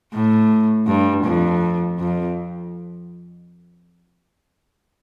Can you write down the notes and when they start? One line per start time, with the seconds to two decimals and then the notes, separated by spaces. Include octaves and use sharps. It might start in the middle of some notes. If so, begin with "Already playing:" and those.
0.13 A2
0.87 G2
1.25 F2
1.99 F2